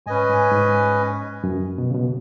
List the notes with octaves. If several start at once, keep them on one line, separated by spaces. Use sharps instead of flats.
G#2 C#4 B4 D#5 G#5
G#2
G#2
F#2
B2
C#3
B2